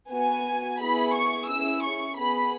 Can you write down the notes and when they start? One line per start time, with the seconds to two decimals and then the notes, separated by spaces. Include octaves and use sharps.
0.12 B3 F#4 G#5
0.80 B3 E4 G#4 B5
1.14 C#6
1.48 C#4 E4 G#4 E6
1.83 C#6
2.16 B3 G#4 B5